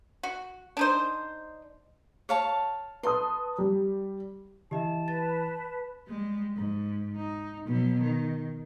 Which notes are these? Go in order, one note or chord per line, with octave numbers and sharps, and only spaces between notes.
F#4
D4 D#4 C5
C#5 F5 A5
B4 A5 C6 D#6
G3
E3 G4 D#5 E5 A5
B4 A6
G3 G#3
G#2
D#4
B2 F#3
D#3